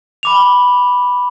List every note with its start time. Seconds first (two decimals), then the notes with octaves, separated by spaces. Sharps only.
0.23 B5 D6 F7